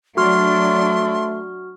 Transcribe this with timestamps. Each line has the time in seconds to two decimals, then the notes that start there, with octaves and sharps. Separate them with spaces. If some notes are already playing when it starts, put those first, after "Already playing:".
0.17 F#3 A3 D4 F#4 C6 F6